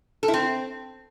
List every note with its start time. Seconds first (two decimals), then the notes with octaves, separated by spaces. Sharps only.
0.23 A4
0.28 E4
0.34 C4